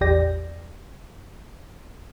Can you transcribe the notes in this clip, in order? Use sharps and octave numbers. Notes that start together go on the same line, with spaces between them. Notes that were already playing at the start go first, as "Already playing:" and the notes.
A1 E2 G4 D5 G5 A#6